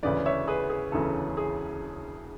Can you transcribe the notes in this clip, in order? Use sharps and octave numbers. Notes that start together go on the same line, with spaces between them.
E1 D2 C#3 E3 B4 D5
C#5 E5
G#4 B4
G#4
E1 D2 C#3 E3 A4
G#4